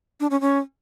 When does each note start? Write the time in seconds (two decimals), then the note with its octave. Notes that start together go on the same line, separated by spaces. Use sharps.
0.20 D4
0.30 C#4
0.41 C#4